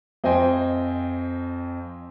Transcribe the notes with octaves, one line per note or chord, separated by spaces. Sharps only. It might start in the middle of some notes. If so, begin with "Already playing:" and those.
F2 C5 D#5 G5 G#5